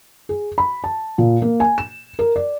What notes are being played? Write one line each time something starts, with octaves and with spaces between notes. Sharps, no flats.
G#4
B5
A5
A#2
A#3
G#5
E7
A#4
D5